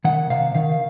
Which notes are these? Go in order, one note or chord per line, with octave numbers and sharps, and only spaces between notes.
D#3 F#5
C3 F5
D#3 F5
F5